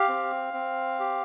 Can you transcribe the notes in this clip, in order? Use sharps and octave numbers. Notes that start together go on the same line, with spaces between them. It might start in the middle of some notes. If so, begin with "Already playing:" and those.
Already playing: G4 F5
C4
C4
G4